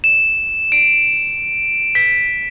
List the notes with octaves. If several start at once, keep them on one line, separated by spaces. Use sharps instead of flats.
E7
D7
B6